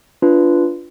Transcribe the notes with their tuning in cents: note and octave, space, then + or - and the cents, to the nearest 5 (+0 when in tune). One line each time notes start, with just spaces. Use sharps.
D4 -10 F4 -15 B4 +0